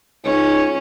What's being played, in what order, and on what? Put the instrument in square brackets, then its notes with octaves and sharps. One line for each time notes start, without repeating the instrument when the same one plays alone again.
[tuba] C#2 [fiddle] C#4 [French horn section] D#4 [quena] C#5